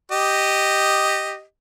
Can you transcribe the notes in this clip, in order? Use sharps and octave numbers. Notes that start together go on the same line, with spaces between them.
G4 D#5